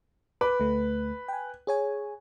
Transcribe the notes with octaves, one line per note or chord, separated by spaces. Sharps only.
B4 D6
D2 A3
G5 G#5
G#4 C#5 G#5